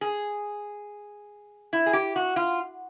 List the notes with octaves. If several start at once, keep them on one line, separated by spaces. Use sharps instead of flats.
G#4
E4
G#4
G4
F#4
F4